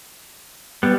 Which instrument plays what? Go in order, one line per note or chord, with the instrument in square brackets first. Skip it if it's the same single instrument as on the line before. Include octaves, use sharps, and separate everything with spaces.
[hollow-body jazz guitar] G3 [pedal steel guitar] B3